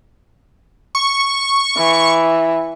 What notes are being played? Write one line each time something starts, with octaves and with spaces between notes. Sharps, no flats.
C#6
E3